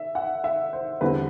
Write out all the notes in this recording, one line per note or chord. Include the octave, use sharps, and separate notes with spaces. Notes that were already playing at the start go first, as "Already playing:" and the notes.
Already playing: E5
F#5
E5
C5
E2 D3 G3 C4 B4